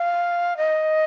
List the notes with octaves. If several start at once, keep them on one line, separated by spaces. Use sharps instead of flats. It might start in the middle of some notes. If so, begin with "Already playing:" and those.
Already playing: F5
D#5